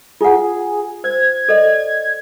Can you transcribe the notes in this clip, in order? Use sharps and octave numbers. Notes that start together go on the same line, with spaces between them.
F4 G#4 F#5
C5 G#6
A4 D5 D#5